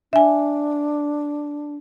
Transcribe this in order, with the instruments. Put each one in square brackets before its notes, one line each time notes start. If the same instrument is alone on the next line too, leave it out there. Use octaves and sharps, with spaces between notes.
[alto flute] D4 [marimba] E5 G#5